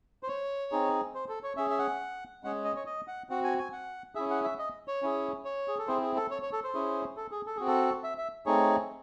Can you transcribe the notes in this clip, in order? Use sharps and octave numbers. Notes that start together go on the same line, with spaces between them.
C5
C#5
C4 D#4 G#4
C5
A4
C#5
C#4 G#4 E5
E5
F#5
G#3 C#4 G#4 F#5
D#5
C#5
D#5
F#5
C4 F#4 F#5
G#5
G#5
F#5
C#4 E4 G#4 E5
F#5
E5
D#5
C#5
C#4 E4 G#4
C#5
G#4
A4
C4 E4 G#4 C5
G#4
A4
C#5
C#5
A4
C5
C#4 E4 G#4
A4
G#4
A4
C4 F#4 G#4
A4
E5
E5
A3 C4 D#4 G#4 C#5